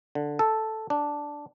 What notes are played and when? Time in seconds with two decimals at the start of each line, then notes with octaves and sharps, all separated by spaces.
0.15 D3
0.39 A4
0.90 D4